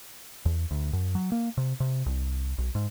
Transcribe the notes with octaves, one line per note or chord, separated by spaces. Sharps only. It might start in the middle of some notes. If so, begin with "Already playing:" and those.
E2
D2
F#2
F#3
A#3
C3
C3
C2
B1
G#2